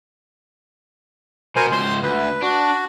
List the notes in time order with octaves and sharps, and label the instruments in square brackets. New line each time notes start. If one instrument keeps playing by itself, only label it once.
[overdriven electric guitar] B2 [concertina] A#4 C5 G#5
[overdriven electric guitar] C#2 C5 [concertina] C6
[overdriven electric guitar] D2 [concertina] B4
[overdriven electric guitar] D4 [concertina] F#4